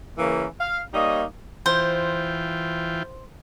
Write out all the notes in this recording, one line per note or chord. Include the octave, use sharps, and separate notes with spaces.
C#3 E3 A#3
F5
G3 A#3 D#4 C#5 D#5
E3 F4 C5 G5